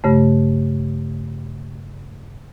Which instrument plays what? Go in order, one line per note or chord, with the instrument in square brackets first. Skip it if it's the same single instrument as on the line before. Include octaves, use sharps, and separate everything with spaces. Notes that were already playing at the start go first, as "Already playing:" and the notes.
[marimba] G2 C#3 A3